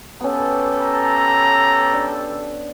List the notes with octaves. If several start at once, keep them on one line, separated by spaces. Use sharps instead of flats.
B1 B3 C#4 G4 A4
A#5
D4